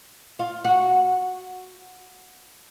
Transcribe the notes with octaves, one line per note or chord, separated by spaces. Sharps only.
F4
F#4